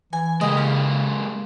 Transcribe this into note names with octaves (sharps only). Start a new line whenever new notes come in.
E3 G#5
C#3 G#3 A#3 G4 D#5
C#4 E4